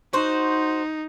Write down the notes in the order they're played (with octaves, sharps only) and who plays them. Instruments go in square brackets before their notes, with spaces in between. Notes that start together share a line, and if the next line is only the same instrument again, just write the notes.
[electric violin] D#4 [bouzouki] F#4 C5